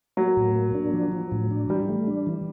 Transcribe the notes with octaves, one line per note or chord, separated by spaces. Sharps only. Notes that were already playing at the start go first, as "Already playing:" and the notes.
F#3 A#3
A2
A#3
D4
F3
F3
A2
D4
E3 G3
A3
D4
E3